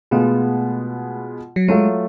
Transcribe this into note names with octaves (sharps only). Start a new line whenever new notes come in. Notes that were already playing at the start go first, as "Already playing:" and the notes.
B2 G#3 A3 B3 F4
F#3
F#3 G#3 A3 F4